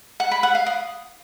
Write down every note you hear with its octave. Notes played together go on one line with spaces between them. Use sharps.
F#5
B5
F#5
F5
D#6